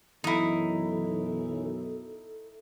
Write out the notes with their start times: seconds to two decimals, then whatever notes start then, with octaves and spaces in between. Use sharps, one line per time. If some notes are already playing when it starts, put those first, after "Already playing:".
0.24 B1 F#2 E3 D#4 E4 A4